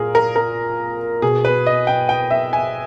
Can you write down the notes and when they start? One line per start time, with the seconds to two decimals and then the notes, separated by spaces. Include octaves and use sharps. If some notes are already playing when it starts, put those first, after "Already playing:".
Already playing: A#2 G#4 A#4
0.15 A#4
0.36 A#4
1.22 B2 G#4
1.45 B4
1.66 D#5
1.87 G5
2.09 G5
2.31 E5
2.53 G#5